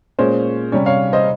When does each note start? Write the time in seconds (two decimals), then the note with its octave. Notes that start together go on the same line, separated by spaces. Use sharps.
0.19 A#2 G#3 C#4 C5
0.72 C3 G3 C#4 C#5
0.86 C#5 F5
1.13 C5 D#5